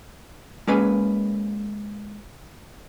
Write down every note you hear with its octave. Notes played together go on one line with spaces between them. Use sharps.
G#3 A#3 C#4 G#4 B4 G#5